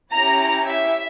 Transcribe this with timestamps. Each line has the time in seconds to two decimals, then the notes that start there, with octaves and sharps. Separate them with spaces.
0.12 C#4 E4 G4 A#5
0.66 E5